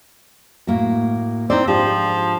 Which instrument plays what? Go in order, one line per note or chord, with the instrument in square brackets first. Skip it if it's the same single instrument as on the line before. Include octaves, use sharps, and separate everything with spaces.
[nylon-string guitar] A2 A#3 F#4
[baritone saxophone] C4 [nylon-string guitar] D#4 E4 D5
[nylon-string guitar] G#2 D4 G4 [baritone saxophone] F3